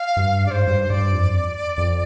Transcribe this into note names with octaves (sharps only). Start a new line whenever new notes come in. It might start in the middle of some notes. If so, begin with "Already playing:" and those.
Already playing: F5
G2
G#2 D5
C5
G2
G2 D5
F2
F2